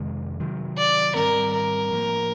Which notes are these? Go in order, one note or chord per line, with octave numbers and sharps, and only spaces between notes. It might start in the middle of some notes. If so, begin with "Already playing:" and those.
Already playing: F2 C3 D#3 G#3
C3 D#3 F#3
D5
G#2 D#3 G3 C4 A#4
A#4
A2 F3 A#3